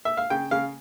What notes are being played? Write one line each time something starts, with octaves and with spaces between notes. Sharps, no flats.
E5
F5
C#3 G5
C#3 F5